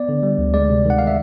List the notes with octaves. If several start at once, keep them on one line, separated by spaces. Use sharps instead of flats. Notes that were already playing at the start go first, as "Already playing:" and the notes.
Already playing: B3 D5
D3
G3
D2
G#3 D5
C3
D#3 F#5
F5
E5